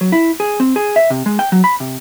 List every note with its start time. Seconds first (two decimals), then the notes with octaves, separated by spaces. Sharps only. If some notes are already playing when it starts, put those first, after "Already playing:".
0.01 F#3
0.12 E4
0.40 G#4
0.60 C4
0.76 G#4
0.96 E5
1.10 C3
1.26 G#3
1.39 G5
1.52 F#3
1.64 B5
1.80 C3